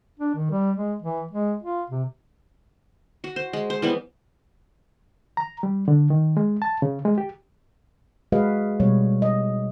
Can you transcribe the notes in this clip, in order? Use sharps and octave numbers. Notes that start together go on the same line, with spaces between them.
D4
D#3
G3
G#3
E3
G#3
F4
C3
F#4
C5
G#3
C5
E3 G3 B3
A#5
G3
D3
D#3
G#3
A5
C#3
G#3
G4
G#3 F#4 G#4 B4 D#5 F5
B2 G3 B3 C#5
D#5